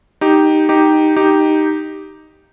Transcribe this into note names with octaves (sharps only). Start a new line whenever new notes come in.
D#4 G4
D#4 G4
D#4 G4